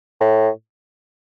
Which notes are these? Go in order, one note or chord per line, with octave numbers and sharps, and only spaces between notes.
A2